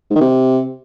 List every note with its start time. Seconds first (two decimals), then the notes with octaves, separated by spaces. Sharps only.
0.10 G#2
0.16 D#3
0.21 C3